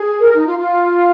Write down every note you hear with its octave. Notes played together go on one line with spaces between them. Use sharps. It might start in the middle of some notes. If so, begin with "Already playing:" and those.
Already playing: G#4
A#4
D#4
F4
F4